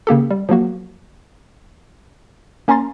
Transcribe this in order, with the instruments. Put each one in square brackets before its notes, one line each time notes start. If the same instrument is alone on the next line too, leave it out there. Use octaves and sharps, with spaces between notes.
[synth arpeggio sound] C#3 A#3 G4 A4
G3
F3 F#3 A#3 F#4
A#3 C#4 G#5 A#5 C6 A6